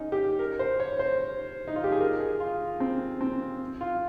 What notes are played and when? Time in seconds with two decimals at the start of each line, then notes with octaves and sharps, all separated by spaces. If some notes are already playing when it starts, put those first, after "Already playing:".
Already playing: C#4 D#4
0.12 G4
0.39 A#4
0.59 C5
0.80 C#5
0.99 C5
1.67 D#4
1.76 F4
1.84 G4
1.92 G#4
2.00 A#4
2.20 G#4
2.40 F4
2.80 C4
3.21 C4
3.81 F4